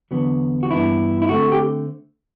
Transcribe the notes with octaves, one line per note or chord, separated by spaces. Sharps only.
E2 D3 F#3 B3
F#4
G2 E3 B3 D4 E4
E4
D3 A3 C4 F#4
G4